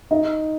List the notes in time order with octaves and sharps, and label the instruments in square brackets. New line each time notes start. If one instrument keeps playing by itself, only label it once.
[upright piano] D#4